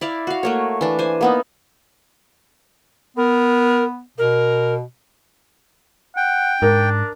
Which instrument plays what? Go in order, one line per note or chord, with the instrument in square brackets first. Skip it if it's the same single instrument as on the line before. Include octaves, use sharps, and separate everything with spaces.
[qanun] E4 D5 F5
F#4 F5
A3 A#3 C#5
E3 D4
C5 G#5
A#3 B3 D#4
[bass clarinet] B3 [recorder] A#4
[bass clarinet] B2 [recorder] A#4
[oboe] F#5 [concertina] G5
[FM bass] G#2 [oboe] D4 [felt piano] A#4